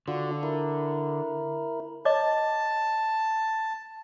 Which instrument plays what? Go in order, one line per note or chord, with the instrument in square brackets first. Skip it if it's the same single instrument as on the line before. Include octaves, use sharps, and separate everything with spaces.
[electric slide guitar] D3 [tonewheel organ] D4 F4 F#4
[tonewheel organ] E4 A#4
[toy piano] C#5 D#5 D6 [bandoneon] A5